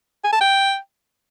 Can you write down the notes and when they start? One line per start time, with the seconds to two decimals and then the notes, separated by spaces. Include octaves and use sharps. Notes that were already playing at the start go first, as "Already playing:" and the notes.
0.24 G#5
0.33 A5
0.41 G5